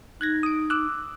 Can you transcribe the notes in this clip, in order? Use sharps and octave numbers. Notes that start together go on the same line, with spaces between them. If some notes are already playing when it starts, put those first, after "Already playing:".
D#4 F#6 G#6 A#6
D#6 D7
D6 E6 F#6